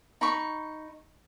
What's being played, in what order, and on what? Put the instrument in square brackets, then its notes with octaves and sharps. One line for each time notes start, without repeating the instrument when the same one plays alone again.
[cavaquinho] D#4 B5 C#6